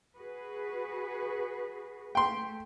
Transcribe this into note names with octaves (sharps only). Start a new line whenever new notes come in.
F#4 G#4 B4
A3 G5 C6